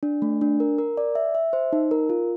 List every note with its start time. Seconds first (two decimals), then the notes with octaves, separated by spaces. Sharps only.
0.03 D4
0.22 A3
0.41 D4
0.60 A#4
0.78 A#4
0.97 D5
1.15 E5
1.35 E5
1.53 C5
1.73 D#4
1.91 A#4
2.10 F4